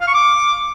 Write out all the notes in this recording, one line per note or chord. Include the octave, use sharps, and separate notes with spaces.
F5
C#6
D6